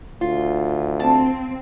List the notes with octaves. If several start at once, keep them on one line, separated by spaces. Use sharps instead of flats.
D2 F4
C4 A5